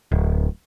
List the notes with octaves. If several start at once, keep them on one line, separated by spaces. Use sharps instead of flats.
D1